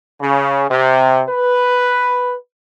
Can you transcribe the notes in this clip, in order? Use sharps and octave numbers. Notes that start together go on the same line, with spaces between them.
C#3
C3
B4